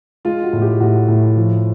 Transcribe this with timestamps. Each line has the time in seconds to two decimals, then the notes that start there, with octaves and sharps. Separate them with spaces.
0.25 G#3 F4
0.43 F#4
0.53 A2
0.62 G4
0.80 A2 F#4
1.08 A2
1.36 F3